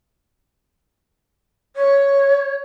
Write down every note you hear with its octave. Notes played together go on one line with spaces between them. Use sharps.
C#5